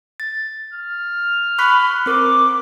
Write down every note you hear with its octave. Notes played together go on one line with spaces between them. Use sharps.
A6
F6
B5 C#6 F#6 B6
C4 A#4 D6